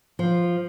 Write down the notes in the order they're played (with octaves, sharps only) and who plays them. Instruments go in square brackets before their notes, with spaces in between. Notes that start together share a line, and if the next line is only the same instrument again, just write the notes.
[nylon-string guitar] F3